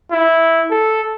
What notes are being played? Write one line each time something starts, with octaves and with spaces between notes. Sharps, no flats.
E4
A4